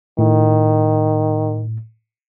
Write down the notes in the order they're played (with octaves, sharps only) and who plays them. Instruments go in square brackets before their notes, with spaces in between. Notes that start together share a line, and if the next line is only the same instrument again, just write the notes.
[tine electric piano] A2 [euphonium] D#3